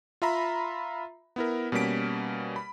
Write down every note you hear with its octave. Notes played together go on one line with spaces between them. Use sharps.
F4 E5 A#5 B5
B3 E4 A#4
B2 G3 A#3 C#4 B6 D7
B5